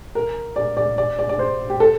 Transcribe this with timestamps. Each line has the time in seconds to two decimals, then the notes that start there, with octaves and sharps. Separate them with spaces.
0.15 A#4
0.56 D5
0.77 D5
0.98 D5
1.19 D5
1.29 D5
1.39 C5
1.70 G4
1.80 A4